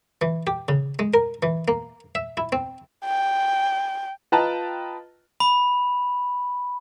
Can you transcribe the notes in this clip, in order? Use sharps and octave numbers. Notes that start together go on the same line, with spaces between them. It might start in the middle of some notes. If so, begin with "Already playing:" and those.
E3
G4
C#3
G#3
A#4
E3
A#3
E5
E4
C4
G5
F4 B4 D#5 G5 A5 A#5
B5